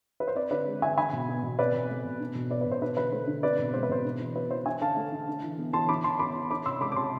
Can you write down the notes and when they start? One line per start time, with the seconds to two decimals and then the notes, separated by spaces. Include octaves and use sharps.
0.20 B4
0.28 C5
0.36 C4 B4 D5
0.51 D3 B4 D5
0.67 G#3
0.82 D3 E5 G#5
0.98 D4 G#5 B5
1.13 B2
1.28 B3
1.43 B2
1.59 C4 B4 D5
1.75 B2
1.90 A3
2.05 B2
2.20 D4
2.35 B2
2.50 B3 B4 D5
2.61 B4
2.66 B2
2.72 C5
2.81 D4 B4
2.97 D3 B4
3.12 A3 C5
3.27 D3
3.43 C4 B4 D5
3.59 B2
3.74 G#3 C5
3.83 B4
3.89 B2 C5
4.05 D4
4.20 E3
4.36 B3 B4
4.51 E3 C5
4.66 D4 E5 G#5
4.82 D3 F5 A5
4.96 A3
5.12 D3
5.28 D4
5.43 E3
5.58 B3
5.73 E3 A5 C6
5.89 D4 B5 D6
6.04 E3 A5 C6
6.19 B3 B5 D6
6.35 E3
6.50 D4 B5 D6
6.66 C3 C6 E6
6.81 G#3 B5 D6
6.92 D6
6.96 C3 A5 C6